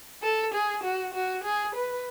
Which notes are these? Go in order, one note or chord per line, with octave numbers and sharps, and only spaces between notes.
A4
G#4
F#4
F#4
G#4
B4